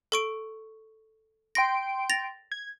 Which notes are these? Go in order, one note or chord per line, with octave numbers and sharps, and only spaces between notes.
A4 C#6 D7
G5 C6 A#6 D7
A6 A#6 F7
G#6